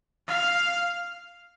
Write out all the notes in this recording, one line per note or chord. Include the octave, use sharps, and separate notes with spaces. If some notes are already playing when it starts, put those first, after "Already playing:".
F5